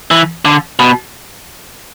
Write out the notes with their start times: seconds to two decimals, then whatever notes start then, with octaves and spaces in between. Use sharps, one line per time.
0.11 E3
0.45 D3
0.79 B2